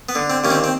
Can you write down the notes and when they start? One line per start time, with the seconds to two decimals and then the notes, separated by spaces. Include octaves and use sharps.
0.09 B3
0.15 D3
0.30 C4
0.44 D#2 C#4
0.50 C4
0.64 C4